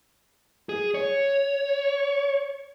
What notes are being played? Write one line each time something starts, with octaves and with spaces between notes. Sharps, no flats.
G#4
C#5